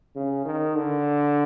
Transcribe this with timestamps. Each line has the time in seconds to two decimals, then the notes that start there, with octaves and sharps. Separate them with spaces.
0.16 C#3
0.45 D#3
0.76 D3